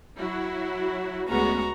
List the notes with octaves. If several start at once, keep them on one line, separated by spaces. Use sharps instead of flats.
F#3 E4 F#4
D2 G#3 B3 C#4 F#4 A#5